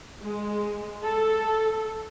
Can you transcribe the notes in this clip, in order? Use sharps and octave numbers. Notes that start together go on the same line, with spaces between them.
G#3
A4